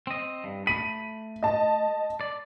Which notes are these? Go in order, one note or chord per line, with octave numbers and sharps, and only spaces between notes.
C4 D#5
G2
A3 B5 D#7
D#5 A5
D5